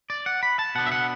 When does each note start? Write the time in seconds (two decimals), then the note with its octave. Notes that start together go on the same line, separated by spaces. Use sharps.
0.10 D5
0.26 F#5
0.43 B5
0.59 A5
0.75 B2 B3 D4 F#5
0.86 E5
0.92 F#5